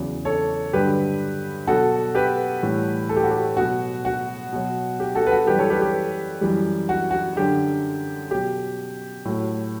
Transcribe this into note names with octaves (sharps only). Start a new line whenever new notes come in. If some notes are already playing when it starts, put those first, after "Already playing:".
Already playing: E2 C#3 F#3
A4 C#5
G2 D3 F#3 G4 B4
B2 F#3 F#4 A4
G4 B4
A2 E3 G3
A4
G4
F#4
G4
B2 F#3 F#4
F#4
B2 F#3
G4
F#4 A4
B4
F#4 A4
F#2 E3 G3 G4 B4
A4 C#5
G4 B4
G4
F#2 E3 G3
F#4
F#4
F#2 D3 F#3 G4
B2 F#3 G4
A2 F#3